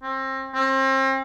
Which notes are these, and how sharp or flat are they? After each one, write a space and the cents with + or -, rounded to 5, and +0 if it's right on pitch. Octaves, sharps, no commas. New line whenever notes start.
C4 +30
C4 +35